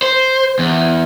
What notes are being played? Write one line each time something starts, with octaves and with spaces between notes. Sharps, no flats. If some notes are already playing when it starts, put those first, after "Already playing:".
C5
E2